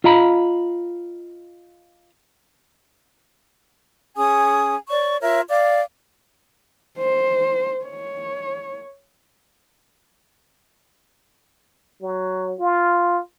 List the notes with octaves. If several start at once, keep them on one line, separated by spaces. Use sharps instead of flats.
F4 D#5 F5 A#5 B5
C#4 G#4 G#5 D#6
C#5 D5 C#6
F4 A#4 C#5 E5
D5 F5 D6
C5
C#5
F#3
F4